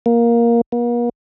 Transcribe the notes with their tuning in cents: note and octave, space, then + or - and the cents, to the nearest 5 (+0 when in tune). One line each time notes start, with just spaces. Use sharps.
A#3 +10
A#3 +45